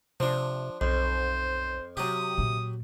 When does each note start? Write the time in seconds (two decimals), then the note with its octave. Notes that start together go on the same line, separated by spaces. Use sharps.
0.20 C3 F3 D4
0.81 B1 F2 C5
1.97 C3 F#3 G4 D#6
2.38 A#2